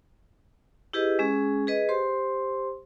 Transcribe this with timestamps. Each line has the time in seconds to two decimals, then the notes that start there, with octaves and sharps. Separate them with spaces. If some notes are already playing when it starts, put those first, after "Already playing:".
0.93 E4 G4 G#4 B4 D#5
1.19 G#3 C#4 G#4
1.67 G#4 B4 D#5
1.89 G4 C5 C6